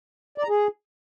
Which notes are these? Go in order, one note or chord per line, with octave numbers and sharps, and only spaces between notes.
D5
A#5
G#4